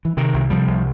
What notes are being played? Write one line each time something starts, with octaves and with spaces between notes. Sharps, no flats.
E3
C3 D#3
C2
C3 F3 G3
C2